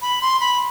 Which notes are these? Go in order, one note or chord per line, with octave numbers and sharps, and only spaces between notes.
B5
C6
B5